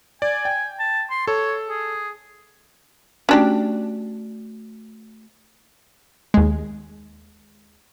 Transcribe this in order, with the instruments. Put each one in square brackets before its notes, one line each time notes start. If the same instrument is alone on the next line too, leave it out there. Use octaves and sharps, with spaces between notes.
[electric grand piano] D5 [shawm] G#5
[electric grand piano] G5
[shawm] A5
C6
[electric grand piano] A4 [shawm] C#5
[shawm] G#4
[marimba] A3 F#4 [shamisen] C#4 D4 G4
[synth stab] D#2 G#3